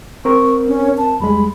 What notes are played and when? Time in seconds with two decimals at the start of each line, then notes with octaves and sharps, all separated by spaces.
0.25 C4 A#4 C#6
0.68 C#4
0.98 A5
1.20 E2 G3 G#3 B5